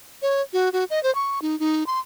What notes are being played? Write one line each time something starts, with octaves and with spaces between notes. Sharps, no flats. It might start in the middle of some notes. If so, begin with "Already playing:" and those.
C#5
F#4
F#4
D#5
C5
C#6
D#4
D#4
C6